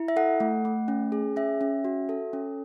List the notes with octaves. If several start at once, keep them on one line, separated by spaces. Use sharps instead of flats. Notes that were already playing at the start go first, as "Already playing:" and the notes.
Already playing: E4
E5
A4 F#5
A3
A3
C#4
G#4
C#4 E5
C#4
F#4
A4
C#4